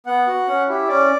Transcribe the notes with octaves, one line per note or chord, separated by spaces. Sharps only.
B3 F#5
F#4
C#4
E4 G4
C#4 D5